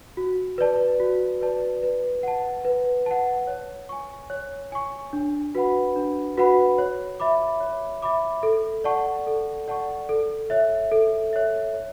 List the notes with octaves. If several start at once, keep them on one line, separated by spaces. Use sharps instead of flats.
F#4
B4 D5 A5
F#4
B4 D5 A5
B4
F#5 A5
B4
F#5 A5
C#5
G#5 C#6
C#5
G#5 C#6
D4
F#4 B4 F#5 B5
D4
F#4 B4 F#5 B5
C#5
E5 B5 D6
C#5
E5 B5 D6
A4
D5 F#5 A5 C#6
A4
D5 F#5 A5 C#6
A4
C#5 E5
A4
C#5 E5
C#5